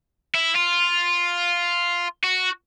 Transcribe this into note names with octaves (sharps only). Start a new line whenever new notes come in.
E4
F4
F#4